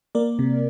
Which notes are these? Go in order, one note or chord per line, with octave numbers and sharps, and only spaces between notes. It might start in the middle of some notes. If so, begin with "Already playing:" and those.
A#3 A#4 D5
C3